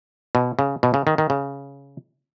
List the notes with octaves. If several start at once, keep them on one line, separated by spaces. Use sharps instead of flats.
B2
C#3
B2
C#3
D#3
D#3
C#3